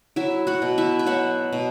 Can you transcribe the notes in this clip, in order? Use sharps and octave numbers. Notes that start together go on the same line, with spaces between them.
F#3 E4 E5
F#4 F#5
B2
E4 E5
E5
F#3 F#4 F#5
B2